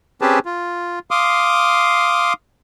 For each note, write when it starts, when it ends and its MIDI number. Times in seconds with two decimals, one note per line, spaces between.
0.21 0.39 60
0.21 0.39 61
0.21 0.39 67
0.21 0.39 68
0.21 0.39 71
0.21 0.39 81
0.45 0.99 65
1.11 2.33 77
1.11 2.33 84
1.11 2.33 86
1.11 2.33 87